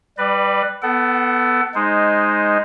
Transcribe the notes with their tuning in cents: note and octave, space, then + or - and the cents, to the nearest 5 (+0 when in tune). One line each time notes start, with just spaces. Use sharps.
G3 +0 B4 +0 D5 +35
B3 +0 A4 +0 F#5 +35
G#3 +0 D#4 -5 C5 +0